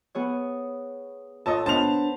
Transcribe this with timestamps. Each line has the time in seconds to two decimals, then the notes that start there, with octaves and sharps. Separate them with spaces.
0.15 B3 G#4 C#5
1.46 A#2 A4 C#5 D#5 A5
1.66 B3 D4 A#4 C5 A5 F7